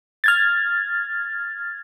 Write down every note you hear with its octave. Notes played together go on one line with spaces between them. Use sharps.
F6 G#6 A6